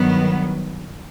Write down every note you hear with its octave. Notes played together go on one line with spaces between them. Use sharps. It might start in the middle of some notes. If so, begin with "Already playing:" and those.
Already playing: G2 D#3 F#3 B3